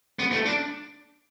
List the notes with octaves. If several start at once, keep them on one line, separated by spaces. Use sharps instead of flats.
B3
A3
D4